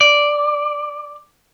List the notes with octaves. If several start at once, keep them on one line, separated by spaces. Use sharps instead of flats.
D5